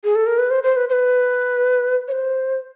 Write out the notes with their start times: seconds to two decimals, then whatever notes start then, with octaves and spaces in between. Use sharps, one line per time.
0.04 G#4
0.15 A4
0.27 A#4
0.38 B4
0.50 C5
0.64 C5
0.77 B4
0.89 C5
0.93 B4
2.08 C#5
2.12 C5